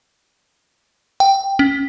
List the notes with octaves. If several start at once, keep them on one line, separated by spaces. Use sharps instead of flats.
G5
C#4